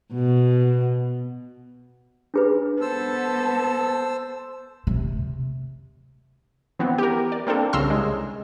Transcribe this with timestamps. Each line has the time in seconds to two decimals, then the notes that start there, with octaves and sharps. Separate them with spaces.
0.13 B2
2.34 D4 G#4 B4
2.81 B3 A4 C5 E6
4.87 C3
6.79 E3 B3 C4
6.98 G4 A#4
7.32 D5
7.47 A#3 C4 D4 A4
7.73 C2 C#3 A#5 C6 E6 F6
7.90 G#3